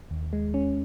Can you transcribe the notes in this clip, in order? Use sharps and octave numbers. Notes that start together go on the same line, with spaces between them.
D#2
G#3
C#4